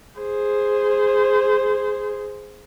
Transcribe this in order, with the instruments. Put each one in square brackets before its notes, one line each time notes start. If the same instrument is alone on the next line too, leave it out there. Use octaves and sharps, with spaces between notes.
[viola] G#4 C5